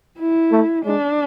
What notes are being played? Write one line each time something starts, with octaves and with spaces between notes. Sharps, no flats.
E4
A3
G#3 D4